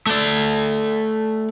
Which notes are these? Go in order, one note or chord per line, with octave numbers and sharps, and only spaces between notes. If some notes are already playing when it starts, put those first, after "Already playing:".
A3 D5